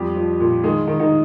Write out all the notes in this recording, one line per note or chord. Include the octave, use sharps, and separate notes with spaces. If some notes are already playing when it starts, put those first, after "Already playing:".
Already playing: F2 F3 G3 G4
F3
A#2
D#3 G#3 G#4
D#3
D#3 D#4